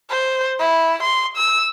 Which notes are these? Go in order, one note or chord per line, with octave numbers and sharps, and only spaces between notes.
C5
E4
C6
E6